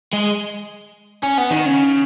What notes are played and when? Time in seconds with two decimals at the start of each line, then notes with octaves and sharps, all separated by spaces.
0.13 G#3
1.23 C#4
1.38 B3
1.51 D#3
1.66 C#3